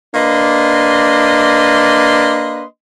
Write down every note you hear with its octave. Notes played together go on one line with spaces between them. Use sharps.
A#3 D4 B4 D#5 C6